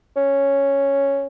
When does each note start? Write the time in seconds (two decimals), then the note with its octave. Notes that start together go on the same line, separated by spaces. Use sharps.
0.16 C#4